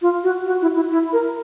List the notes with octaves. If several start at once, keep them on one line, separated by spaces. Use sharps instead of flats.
F4
F#4
F#4
E4
E4
E4
A#4